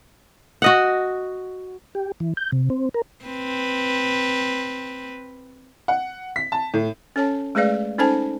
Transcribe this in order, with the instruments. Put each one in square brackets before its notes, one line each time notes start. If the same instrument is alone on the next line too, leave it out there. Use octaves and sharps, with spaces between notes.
[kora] F#4 D#5 F#5
[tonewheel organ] G4
E3
G6
C3
C4
A#4
[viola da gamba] C4 B4
[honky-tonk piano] F#5
B6
A5
A2
[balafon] C#4 A4 C#5 A5
G#3 A3 G#4 B4 D5 F5
C#4 D#4 A4 C5 G#5 A5